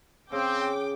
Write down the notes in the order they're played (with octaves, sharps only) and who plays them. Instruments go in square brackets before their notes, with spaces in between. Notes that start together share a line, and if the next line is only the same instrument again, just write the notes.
[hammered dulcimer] C#3 G#4 [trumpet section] C4 [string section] G5 D6